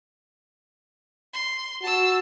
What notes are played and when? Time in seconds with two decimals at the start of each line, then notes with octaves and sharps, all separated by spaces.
1.33 C6
1.82 F#4 A5 E6